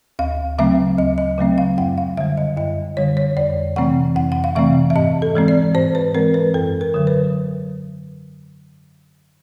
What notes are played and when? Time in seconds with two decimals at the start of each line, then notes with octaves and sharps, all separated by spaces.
0.19 D2 F5
0.58 C#3 F#3 A3 C4 E5
0.98 D2 D#5
1.18 D#5
1.38 C#3 F#3 A3 C4
1.58 F5
1.78 F#2 F#5
1.98 F5
2.17 D3 G3 E5
2.37 D#5
2.57 F#2 D#5
2.97 D3 G3 C#5
3.17 C#5
3.37 F2 D5
3.76 C3 E3 A3 C4 F#5
4.16 F2 F#5
4.32 F#5
4.44 F5
4.55 C3 E3 A3 C4 E5
4.90 E5
4.96 G#2 D#5
5.22 A4
5.35 E3 G#3 C4
5.48 D5
5.75 G#2 C5
5.95 B4
6.14 E3 G#3 C4 A#4
6.34 B4
6.54 F#2 A4
6.81 A#4
6.94 D3 F#3
7.07 B4